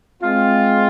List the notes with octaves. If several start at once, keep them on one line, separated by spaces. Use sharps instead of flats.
G#3 C4 F4